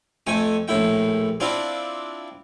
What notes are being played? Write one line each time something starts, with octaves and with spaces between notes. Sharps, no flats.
F2 A3 G5 G#5
A#1 A2 E4 G5
C4 D4 E4 F4 D5